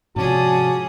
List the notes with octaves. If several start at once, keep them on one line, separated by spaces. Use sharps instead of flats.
G#2 C3 F3 C#4 F#4 G#4 D5 A5